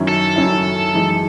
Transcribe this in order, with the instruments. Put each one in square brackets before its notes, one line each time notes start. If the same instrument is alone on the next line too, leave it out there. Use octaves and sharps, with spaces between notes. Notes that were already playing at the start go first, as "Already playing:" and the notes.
Already playing: [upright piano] F#2 D#3 F#3 C#4 E4
[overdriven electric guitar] A4
[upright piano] F#2 D#3 F#3 C#4 E4
F#2 E3 G#3 D#4